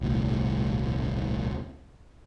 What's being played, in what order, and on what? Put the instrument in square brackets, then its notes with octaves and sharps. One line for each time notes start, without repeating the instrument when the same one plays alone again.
[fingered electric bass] D#1 C2 A2